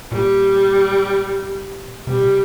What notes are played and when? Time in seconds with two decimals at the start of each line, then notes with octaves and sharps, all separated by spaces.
0.12 A#2 G3
2.07 C3 G3
2.16 A#2
2.24 C3